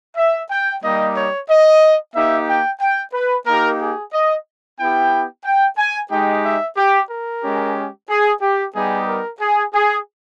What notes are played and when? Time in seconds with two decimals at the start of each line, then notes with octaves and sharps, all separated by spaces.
0.17 E5
0.51 G5
0.84 G3 A#3 D#4 G4 D#5
1.17 C#5
1.50 D#5
2.15 A#3 D#4 G4 E5
2.48 G5
2.80 G5
3.14 B4
3.46 A#3 D#4 G4 A#4
3.80 G#4
4.13 D#5
4.79 B3 E4 G4 G5
5.44 G5
5.78 G#5
6.11 G#3 D#4 G4 G5
6.44 E5
6.77 G4
7.09 A#4
7.43 G#3 C#4 G4
8.09 G#4
8.41 G4
8.75 G3 B3 D#4 G4 G#4
9.07 A#4
9.41 G#4
9.74 G#4